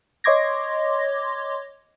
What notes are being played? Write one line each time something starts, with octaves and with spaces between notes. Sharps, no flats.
C#5 D#5 C6 D6 G#6 A#6